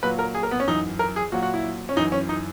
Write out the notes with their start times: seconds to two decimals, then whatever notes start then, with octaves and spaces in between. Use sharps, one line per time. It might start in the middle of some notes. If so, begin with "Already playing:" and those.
0.03 A#2 F#3 B4
0.19 A#4
0.35 G#4
0.43 A#4
0.51 B3
0.60 C#4
0.68 F#2 E3 D#4
0.99 A#4
1.16 G#4
1.32 A#2 F#3 F#4
1.42 F#4
1.54 E4
1.89 C#4
1.96 F#2 E3 D#4
2.12 C#4
2.29 D#4